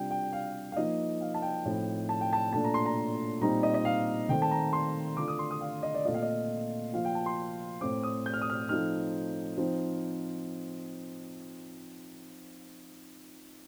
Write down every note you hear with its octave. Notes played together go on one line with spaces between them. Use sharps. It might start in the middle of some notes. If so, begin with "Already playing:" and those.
Already playing: C3 G3 D4 F4 G5
G5
F5
F5
F3 A#3 D#4 D#5
F5
A5
G5
A2 F3 C4 D#4
A5
G5
A5
A#2 A3 D4 A5
A#5
C6
A#5
A#2 G3 C4 D#4 A#5
D#5
D#5
F5
D#3 A3 C4 G5
A5
A#5
C6
D3 A3 D4 F4 D6
D#6
C6
D#6
F5
D#5
D5
A#2 A3 C4 F4 D#5
F5
D#5
F3 A#3 F4 F5
G5
A5
C6
A2 A3 C4 D6
D#6
G6
F6
D#6
F6
F3 A3 C4 D#4 F6
F3 C4 D#4